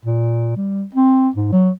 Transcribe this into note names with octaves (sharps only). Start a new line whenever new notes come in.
A#2
G3
C4
G#2
F#3